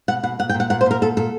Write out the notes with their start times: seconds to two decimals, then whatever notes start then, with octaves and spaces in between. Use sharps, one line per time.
0.08 B2 F#5
0.23 B2 F#5
0.39 A#2 F#5
0.49 G5
0.54 A#2
0.60 F#5
0.70 A#2 F#5
0.81 C5
0.86 A#2 A#4
1.02 A#2 A4
1.17 A#2 A4